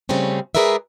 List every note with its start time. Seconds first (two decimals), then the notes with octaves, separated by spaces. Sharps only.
0.09 C#3 G3 A3 C4 C#4
0.55 G#3 G#4 A#4 B4 D5 E5